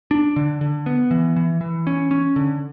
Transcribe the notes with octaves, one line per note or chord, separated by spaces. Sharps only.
D4
D3
D3
B3
E3
E3
E3
C#4
C#4
D3